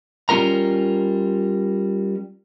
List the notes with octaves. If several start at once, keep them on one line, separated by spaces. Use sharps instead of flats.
G3 C#4 F4 A#4 A#5